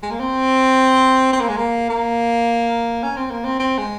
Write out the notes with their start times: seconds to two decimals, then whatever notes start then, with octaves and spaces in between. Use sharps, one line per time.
0.03 G#3
0.11 A#3
0.20 C4
1.33 C4
1.41 A#3
1.49 G#3
1.57 A#3
1.89 A#3
3.03 C#4
3.17 C4
3.31 A#3
3.45 C4
3.60 C4
3.78 G#3